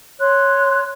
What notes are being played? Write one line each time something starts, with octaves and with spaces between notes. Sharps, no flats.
C#5 C6 F#6